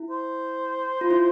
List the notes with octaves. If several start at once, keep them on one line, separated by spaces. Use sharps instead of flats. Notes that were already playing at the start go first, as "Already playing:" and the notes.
Already playing: E4
C5
F4
E4